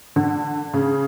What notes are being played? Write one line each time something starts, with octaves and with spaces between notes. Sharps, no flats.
D3
C#3